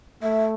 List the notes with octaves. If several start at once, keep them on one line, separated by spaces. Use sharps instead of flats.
A3 E5